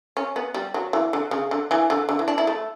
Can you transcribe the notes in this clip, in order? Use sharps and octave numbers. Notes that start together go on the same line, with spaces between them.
C#4
B3
G3
F#3
E3
D3
C#3
D3
E3
D3
D3
E3
D4
E4
A3